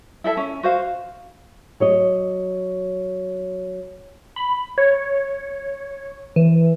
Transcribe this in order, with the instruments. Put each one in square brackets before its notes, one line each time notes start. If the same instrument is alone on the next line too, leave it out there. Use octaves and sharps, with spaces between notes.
[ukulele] E4 A4 E5 A5
C#4
F#4 C5 F5
[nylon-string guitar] F#3 C#5 D#5
[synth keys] B5
C#5
E3